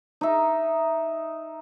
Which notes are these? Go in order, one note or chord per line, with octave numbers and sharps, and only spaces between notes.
D#4 E5